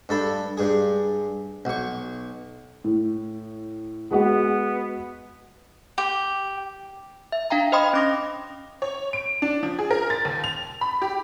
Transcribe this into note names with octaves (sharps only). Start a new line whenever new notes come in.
G2 A4 B5
G2 G#4
B1 C#6
A2
G#3 B3 F#4 F#5
G4
E5
D4 F5 G5 A#5
C5 D#5 G5 B5 C6 D#6
C#4 D6 A#6
C#5
D7
D4
F3
G#4
A#4
A6
D#2
F7
B5
G4